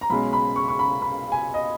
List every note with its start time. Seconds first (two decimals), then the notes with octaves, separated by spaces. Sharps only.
0.01 A#5
0.10 B1 B2 G#3 C#4 B5
0.33 B5
0.56 C#6
0.68 C#6
0.79 B5
1.02 B5
1.32 G#5
1.54 D#5